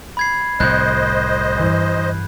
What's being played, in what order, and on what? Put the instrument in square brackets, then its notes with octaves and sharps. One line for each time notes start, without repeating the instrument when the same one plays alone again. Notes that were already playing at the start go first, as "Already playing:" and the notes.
[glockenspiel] B5 G#6 C7
[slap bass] C2 A2 C3 [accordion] C5 D#5 [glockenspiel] F#6 G6
[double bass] G2 E3